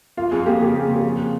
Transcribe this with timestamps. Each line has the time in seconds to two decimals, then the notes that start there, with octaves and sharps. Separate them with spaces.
0.17 F2 F4
0.31 F2 G#4
0.46 A#3 G4
0.61 C#3 G4
0.75 A#3
0.82 G#4
0.89 C#3
0.96 G4
1.04 F3
1.09 G#4